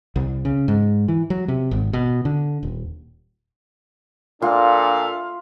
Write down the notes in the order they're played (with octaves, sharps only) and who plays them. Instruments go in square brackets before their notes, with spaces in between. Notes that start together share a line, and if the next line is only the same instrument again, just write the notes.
[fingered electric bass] C2
C#3
G#2
E3
F#3
C3
G#1
B2
D3
D#1
[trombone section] A#2 D4 [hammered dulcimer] F4 [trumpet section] A4 E5 F5